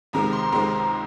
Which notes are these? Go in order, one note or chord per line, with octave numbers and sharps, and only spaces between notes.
C#2 C3 D#3 G#3 C4 A#5
C6
C#2 C3 D#3 G#3 C4 A#5